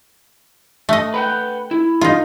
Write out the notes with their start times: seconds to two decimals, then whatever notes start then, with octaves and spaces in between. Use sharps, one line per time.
0.89 A3 D#5
1.14 B4 F#5 G5
1.71 E4
2.01 D#4 F4